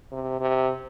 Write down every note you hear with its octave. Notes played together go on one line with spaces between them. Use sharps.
C3
C3